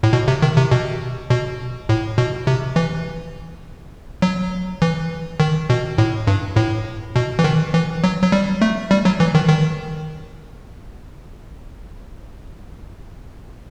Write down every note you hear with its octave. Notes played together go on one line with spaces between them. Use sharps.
A2
B2
C3
D#3
C3
B2
B2
A2
B2
C3
E3
F#3
E3
D#3
B2
A2
G2
A2
B2
E3
D#3
E3
F#3
F#3
G3
A3
G3
F#3
E3
D#3
D#3